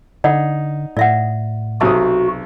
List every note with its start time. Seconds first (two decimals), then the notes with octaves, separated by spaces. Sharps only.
0.24 D3 D#4 D5 F#5
0.97 A2 D5 E5 F#5
1.81 B1 C3 F#4 D#6